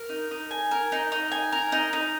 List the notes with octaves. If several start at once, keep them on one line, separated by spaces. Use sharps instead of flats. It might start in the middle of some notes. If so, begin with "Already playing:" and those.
Already playing: A#4
D#4
D#4
G#5
A#4
D#4
D#4
G#5
A#4
D#4
D#4